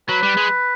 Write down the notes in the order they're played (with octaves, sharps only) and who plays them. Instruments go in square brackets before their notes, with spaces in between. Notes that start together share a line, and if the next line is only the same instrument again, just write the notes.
[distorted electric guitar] F#3 [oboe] B4
[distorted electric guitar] G3
G#3